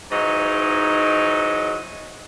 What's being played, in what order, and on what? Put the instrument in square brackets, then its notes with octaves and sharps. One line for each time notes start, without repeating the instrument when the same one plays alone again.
[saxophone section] G#2 E3 F#3 D#4 D#5